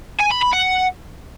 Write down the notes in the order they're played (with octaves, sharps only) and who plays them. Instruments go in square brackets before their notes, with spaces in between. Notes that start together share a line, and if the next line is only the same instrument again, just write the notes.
[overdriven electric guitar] G#5
B5
B5
F#5